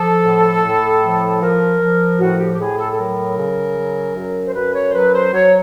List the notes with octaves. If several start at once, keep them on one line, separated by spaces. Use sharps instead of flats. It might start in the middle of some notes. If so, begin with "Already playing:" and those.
Already playing: F3 A4
A2
A2
F3
F3 A#4
F3
A2 F#4
G4
G4
A2 G#4
A4
A4
F#3 A#4
C#3
F#3
F#2
C5
F#2 B4
C#5
C5
F#3 B4
C5
F#3 C#5